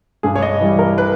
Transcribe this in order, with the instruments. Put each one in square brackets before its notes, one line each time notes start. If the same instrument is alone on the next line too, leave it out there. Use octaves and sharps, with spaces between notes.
[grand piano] G2 G#4
C#5
D#5
E3 G3
A#4
B4